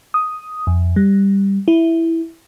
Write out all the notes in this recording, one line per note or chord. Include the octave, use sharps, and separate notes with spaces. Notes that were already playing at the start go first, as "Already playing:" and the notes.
D#6
F2
G3
E4